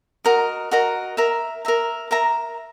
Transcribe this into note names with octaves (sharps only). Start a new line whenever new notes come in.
F#4 A#4 D#5 A#5
F#4 A#4 D#5 A#5
A#4 E5 A#5
A#4 E5 A#5
A#4 E5 A#5